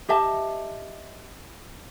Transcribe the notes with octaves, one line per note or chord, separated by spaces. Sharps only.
G4 D#5 E5 A5